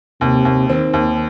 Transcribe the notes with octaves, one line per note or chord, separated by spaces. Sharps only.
D#2 C3
D#2
D#3 C4
D#2